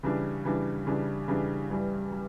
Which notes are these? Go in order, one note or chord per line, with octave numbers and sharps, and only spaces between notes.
C#3 E3 G3 D4
C#3 E3 G3 D4
C#3 E3 G3 D4
C#3 E3 G3 D4
G2 E3 G3
G3